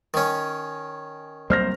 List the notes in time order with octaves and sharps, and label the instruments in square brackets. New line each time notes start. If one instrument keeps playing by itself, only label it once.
[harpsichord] D#3 C#4
[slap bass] C2 F#3 A#3 [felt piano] C5 F6 A#6